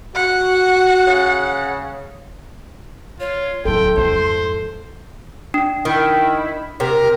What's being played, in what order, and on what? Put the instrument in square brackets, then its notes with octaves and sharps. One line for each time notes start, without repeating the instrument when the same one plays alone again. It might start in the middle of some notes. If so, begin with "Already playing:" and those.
[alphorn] F#4 [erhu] F#5
[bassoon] C#3
[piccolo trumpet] F4 [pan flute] C#5
[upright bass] D1 F#3 [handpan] E4 A4 [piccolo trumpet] G5 [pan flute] C6
[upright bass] F2 G#2 [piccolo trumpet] C5
[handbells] D4
[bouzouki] D#3 [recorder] E4
[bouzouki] C3 [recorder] A#4